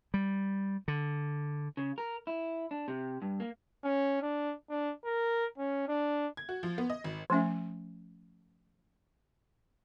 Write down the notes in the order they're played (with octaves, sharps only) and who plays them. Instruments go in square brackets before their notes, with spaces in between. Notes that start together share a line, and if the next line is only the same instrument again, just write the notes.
[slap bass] G3
D3
[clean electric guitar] C#3
A#4
E4
D4
C3
G2
A#3
[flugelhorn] C#4
D4
D4
A#4
C#4
D4
[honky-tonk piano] G#6
F#4
F3
B3
D#5
G#1
[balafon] F3 A3 C#4 E5